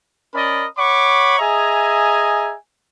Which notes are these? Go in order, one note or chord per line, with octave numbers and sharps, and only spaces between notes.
C#4 A#4 D5 D#5 B5
C#5 F#5 B5 C#6 D6
G#4 D#5 E5 G#5 A#5